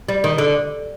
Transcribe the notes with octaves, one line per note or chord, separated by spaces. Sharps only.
G3
D#3
D3